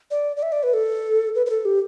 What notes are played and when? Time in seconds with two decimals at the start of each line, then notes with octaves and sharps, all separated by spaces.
0.11 D5
0.37 D5
0.43 E5
0.52 D5
0.63 B4
0.74 A4
1.35 B4
1.46 B4
1.50 A4
1.65 G4